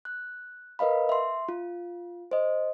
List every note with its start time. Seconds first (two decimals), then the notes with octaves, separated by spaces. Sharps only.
0.05 F#6
0.79 A#4 B4 D#5 F5 B5
1.09 E5 C6
1.49 F4
2.31 C5 D#5